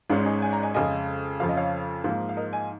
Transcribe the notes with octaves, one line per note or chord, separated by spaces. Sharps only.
G#1 G#2 G#3 C#4 F4
D#4 G#4
G#5
A#5
D#5 G#5
F2 C#3 G#3 D#5 G#5
F2 C#3 F3 C#4 F5
D#5
C#5 F5
G#2 F3 A#3
F5
A#4 D#5
D#5 G#5